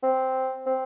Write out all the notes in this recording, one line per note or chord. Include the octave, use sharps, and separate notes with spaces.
C4
C4